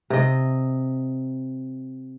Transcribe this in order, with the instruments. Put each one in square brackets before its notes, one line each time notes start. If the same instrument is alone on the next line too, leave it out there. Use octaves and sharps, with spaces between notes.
[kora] C3 D#5